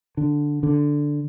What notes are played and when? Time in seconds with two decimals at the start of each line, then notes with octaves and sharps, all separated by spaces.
0.17 D3
0.63 D3